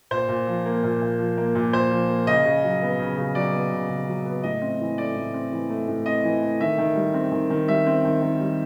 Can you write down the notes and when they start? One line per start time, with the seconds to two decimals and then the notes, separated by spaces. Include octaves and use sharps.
0.11 A#2 C5
0.28 A#2
0.47 F3
0.66 A#3
0.84 A#2
1.02 A#2
1.19 F3
1.37 A#3
1.55 A#2
1.73 A#2 C5
1.91 F3
2.09 A#3
2.27 C#3 D#5
2.45 C#3
2.64 F#3
2.82 B3
2.99 C#3
3.17 C#3
3.35 F#3 D5
3.54 B3
3.72 C#3
3.90 C#3
4.08 F#3
4.26 B3
4.43 A2 D#5
4.61 C4
4.80 E3
4.98 A3 D5
5.16 A2
5.34 C4
5.52 E3
5.70 A3
5.88 A2
6.06 C4 D#5
6.24 E3
6.43 A3
6.60 D#3 E5
6.78 D#3
6.96 G3
7.14 C4
7.32 D#3
7.50 D#3
7.68 G3 E5
7.86 C4
8.05 D#3
8.22 D#3
8.40 G3